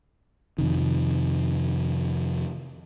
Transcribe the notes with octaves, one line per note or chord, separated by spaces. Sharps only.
F2 C3 D#3